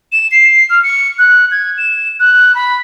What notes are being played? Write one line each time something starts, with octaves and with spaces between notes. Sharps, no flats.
E7
C7
F6
C#7
F#6
G#6
E7
F#6
B5